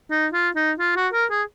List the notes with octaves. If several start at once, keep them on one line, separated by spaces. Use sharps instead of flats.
D#4
F4
D#4
F4
F#4
A#4
G#4